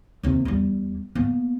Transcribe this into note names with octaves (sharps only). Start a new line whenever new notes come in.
D#2 C3
E2 G3
A#3 B3